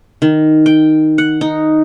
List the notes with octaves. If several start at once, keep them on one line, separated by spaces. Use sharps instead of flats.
D#3
G5
F#5
D#4